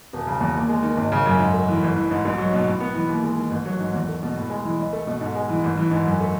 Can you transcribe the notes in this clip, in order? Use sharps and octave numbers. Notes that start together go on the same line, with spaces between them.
E1
C#3
E2
D#2
G#3
D#3
G#1
C#3
F#2
G#2
A3
E3
A1
E3
G#2
B1
F#3
B2
A2
B3
E3
D#2
G#3
D#3
A1
F#3
G#2
E2
A3
B2
A2
G#3
E3
C#2
A3
B2
G#2
G#3
E3
A1
E3
G#2
F#2
A3